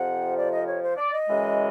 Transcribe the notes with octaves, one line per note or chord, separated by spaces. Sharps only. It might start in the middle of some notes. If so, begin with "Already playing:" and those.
Already playing: F2 C3 F3 F#5
D5
D#5
C#5
C5
D5
D#5
F#2 C#3 E3 G#3